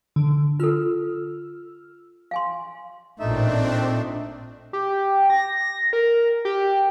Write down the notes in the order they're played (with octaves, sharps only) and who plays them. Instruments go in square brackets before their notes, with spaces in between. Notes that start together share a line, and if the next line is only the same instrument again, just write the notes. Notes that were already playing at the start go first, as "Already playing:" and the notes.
[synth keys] D3
[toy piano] F4 A4 [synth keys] E6 F6
[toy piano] F5 G#5 C6
[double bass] A1 A#2 [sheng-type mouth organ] A3 D#4 E5 [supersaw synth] C4 D4
[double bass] A#2
[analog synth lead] G4
A#6
A#4
G4